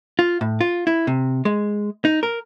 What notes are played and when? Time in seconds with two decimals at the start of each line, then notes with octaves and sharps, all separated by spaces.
0.19 F4
0.41 A2
0.61 F4
0.87 E4
1.07 C3
1.45 G#3
2.05 D#4
2.23 A#4